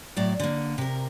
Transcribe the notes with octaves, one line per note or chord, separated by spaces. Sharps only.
A2 F#3 D5
D3 A#3
C3 A#4